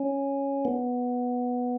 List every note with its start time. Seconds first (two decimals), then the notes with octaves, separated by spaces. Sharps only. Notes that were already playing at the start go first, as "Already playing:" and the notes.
Already playing: C#4
0.65 B3